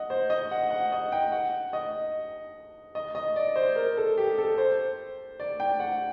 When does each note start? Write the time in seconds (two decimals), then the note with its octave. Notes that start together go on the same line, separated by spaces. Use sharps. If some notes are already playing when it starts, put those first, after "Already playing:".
Already playing: D#5 F#5
0.10 C5
0.30 D#5
0.51 F#5
0.71 F#5
0.92 D#5
1.12 G5
1.32 F#5
1.73 D#5
2.95 D#5
3.15 D#5
3.36 D5
3.56 C5
3.76 A#4
3.97 A4
4.18 G4
4.38 A4
4.58 C5
5.40 D5
5.60 G5
5.80 F#5